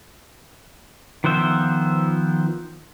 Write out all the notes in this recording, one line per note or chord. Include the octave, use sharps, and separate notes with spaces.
D#3 F3 B3 C5 E5